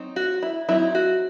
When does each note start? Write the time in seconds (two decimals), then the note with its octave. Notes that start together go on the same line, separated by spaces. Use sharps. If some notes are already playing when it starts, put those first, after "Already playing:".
Already playing: F#3 C4 D#4
0.16 F#4
0.43 E4
0.69 F#3 C4 D#4 E4
0.95 F#4